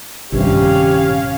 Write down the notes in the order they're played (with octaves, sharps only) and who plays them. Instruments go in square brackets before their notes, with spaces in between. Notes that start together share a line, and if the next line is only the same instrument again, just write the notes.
[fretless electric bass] A#1 G2 C3 [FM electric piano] D#3 [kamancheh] C#4 F5 [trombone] G4